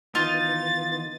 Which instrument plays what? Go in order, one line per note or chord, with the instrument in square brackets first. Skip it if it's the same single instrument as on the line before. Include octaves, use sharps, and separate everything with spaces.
[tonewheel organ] D#3 E3 B3 [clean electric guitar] D#4 [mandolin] F4 [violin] A6